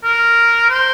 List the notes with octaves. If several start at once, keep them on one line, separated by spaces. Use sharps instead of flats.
A#4
C5